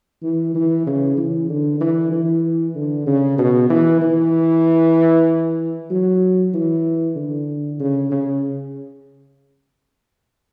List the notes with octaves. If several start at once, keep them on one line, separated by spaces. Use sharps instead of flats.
E3
E3
C#3
E3
D3
E3
E3
D3
C#3
B2
E3
E3
F#3
E3
D3
C#3
C#3